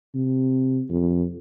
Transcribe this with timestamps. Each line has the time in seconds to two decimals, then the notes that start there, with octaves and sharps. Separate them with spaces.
0.14 C3
0.90 F2